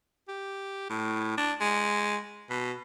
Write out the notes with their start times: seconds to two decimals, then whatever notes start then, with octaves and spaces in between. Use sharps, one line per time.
0.28 G4
0.90 A2
1.38 D4
1.61 G#3
2.50 B2